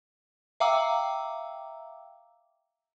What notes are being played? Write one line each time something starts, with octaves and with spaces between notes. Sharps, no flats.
E5 F5 G5 A#5 D6 E6